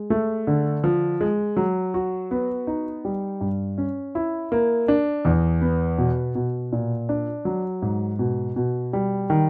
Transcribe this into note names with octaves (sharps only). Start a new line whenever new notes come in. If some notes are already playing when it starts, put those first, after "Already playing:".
Already playing: G#3
A3
D3
F3
G#3
F#3
F#4
B3
D#4
G3
G2
C#4
E4
A#3
D4
E2
B3
B2
B2
A#2
D4
F#3
G#2
B2
B2
G3
D#3